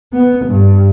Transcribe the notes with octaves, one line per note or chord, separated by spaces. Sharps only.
B3
G2